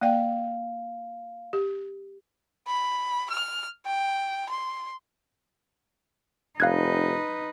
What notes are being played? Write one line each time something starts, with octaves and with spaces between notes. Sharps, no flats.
A#3 D5 F5 G5
G4
B5
F6
G5
C6
F1 D#4 B4 F5 F#6 G#6